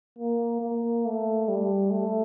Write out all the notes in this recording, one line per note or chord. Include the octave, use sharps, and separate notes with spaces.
A#3
A#3
A3
G3
A3